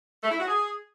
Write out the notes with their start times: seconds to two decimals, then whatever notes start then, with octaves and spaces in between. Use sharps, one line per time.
0.23 A3
0.31 E4
0.39 F#4
0.47 G#4